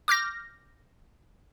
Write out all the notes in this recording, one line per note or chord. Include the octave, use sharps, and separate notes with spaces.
D6 F6 G6 A#6